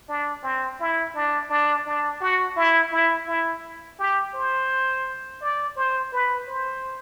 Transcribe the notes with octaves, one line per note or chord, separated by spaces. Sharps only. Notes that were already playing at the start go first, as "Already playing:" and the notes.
D4
C4
E4
D4
D4
D4
F#4
E4
E4
E4
G4
C5
D5
C5
B4
C5